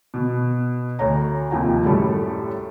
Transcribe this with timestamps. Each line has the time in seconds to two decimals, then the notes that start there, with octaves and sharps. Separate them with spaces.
0.14 B2
0.99 D2 C#5 A#5
1.51 D#2 C3 F3 G5 G#5
1.84 F#2 A2 G3 G4 A4